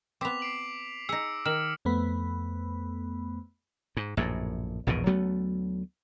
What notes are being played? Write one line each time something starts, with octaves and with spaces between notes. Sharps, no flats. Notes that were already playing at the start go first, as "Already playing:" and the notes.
B3 C4 D6 B6 F7
C7 D7 F#7
D#4 G#4 E6 A#6 C#7
D#3 F6 E7 F#7
F2 A3 B3 B5
G#2
A#1 F#2 A2
A#1 E2 G#2 B2
D2 F#3 A3 B3